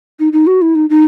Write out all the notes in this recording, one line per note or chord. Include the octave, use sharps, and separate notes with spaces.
D#4
D#4
F#4
E4
D#4
D#4